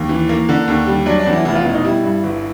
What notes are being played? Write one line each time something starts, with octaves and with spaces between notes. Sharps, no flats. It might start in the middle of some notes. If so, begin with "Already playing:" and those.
Already playing: D#2
E3
A#3
D3
D#2
G3
F#3 D4
D4
E2
E4
F1 E4
F4
B2 E4
D#4
G3 E4
G2
G1